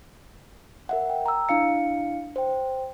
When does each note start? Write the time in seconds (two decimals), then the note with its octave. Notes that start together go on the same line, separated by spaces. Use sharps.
0.89 A#4 E5 F#5
1.10 G5
1.26 A#5 E6
1.49 D4 E4 F5 C#7
2.36 C5 G5